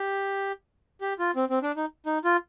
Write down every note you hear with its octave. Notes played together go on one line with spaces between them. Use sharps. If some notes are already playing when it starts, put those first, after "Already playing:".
Already playing: G4
G4
F4
C4
C4
D4
D#4
D#4
F4